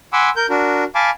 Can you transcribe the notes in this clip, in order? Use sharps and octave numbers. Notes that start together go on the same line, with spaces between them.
F#5 G#5 B5 C6 D6 E6
A#4 G6
D4 F#4 A#4
F5 G#5 A5 B5 D6